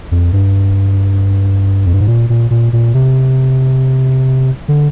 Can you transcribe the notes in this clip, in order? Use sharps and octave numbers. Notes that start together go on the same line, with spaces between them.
F2
G2
F2
G2
G#2
A#2
A#2
A#2
A#2
C3
D3